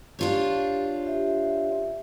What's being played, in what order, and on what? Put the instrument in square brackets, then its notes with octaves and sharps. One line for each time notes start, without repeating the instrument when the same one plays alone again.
[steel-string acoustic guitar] D4 F4 C#5 [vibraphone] G4
[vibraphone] G4 E5